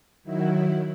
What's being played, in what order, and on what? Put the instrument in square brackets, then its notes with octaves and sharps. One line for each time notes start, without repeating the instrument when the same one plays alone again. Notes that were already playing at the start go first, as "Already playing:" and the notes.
[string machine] D#3 F#3 E4